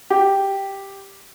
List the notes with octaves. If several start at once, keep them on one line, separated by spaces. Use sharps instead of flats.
G4